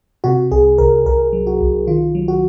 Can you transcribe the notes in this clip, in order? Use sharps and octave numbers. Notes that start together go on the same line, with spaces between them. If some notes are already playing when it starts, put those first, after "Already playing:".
C3 F#4
C2 G#4
C2 A#4
C2 A#4
F#3
F#4
C2
D#3 F4
F#3
F#4